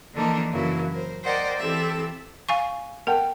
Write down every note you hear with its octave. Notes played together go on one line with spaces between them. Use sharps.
D3 E3 F3 A#3 D4 D#4
F#2 C#3 E3 F#3 A#3 E4
A#4 C5
A#4 C5 D5 D#5 F#5 G5
E3 C4 E4 G4 A4 E5
F5 G#5 C#6
A#4 F#5 G5 A5